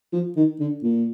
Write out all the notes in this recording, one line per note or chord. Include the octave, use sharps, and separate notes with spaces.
F3
D#3
D3
A#2